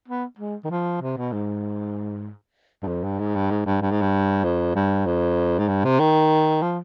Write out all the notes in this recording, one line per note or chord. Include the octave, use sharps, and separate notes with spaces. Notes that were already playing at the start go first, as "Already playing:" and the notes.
B3
G#3
D#3
F3
C3
B2
G#2
G2
F2
G2
G#2
G2
G#2
G2
G2
G#2
G2
F2
G2
F2
G#2
G2
C3
D#3
F3